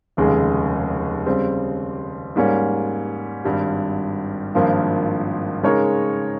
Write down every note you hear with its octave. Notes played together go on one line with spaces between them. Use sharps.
F1 D#2 C#3 G#3
C#3 G3 C4
G#2 G3 A#3 C#4
G#1 G2 G3
G#1 G2 F3 A#3 F4
C#3 G#3 D#4 A#4 C#5